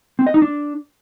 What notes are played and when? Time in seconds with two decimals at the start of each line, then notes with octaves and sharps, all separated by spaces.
0.19 C4
0.27 D#5
0.34 D#4
0.42 D4